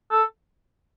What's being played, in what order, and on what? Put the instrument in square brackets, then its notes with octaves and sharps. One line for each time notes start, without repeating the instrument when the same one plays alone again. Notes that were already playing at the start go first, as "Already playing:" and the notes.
[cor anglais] A4